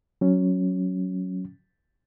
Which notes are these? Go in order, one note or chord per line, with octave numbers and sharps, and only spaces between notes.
F#3 C#4